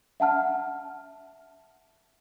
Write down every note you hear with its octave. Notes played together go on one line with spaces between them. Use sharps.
E5 F#5 A5 F6